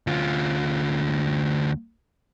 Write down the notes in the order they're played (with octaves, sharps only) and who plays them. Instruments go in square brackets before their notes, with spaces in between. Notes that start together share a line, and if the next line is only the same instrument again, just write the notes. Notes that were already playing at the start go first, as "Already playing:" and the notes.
[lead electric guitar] D2 F4